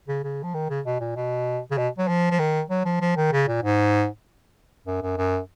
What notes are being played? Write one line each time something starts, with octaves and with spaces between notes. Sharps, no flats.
C#3
C#3
F3
D#3
C#3
B2
A#2
B2
C#3
B2
F#3
F3
F3
D#3
F#3
F3
F3
D#3
C#3
A#2
G#2
F#2
F#2
F#2